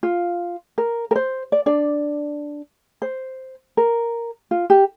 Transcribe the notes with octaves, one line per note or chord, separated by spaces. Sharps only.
F4
A#4
A#4
C5
D5
D4 D5
C5
A#4
F4
G4